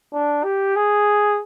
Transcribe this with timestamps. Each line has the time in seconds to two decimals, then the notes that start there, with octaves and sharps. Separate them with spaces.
0.13 D4
0.43 G4
0.76 G#4